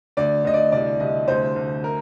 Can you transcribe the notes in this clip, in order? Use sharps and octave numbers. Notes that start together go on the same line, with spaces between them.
D2 D5
D2 D#5
D5
C2 D5
C2 D#5
D2 C5
D2
A#4